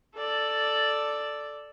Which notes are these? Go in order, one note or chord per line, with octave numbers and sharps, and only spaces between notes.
A4 D5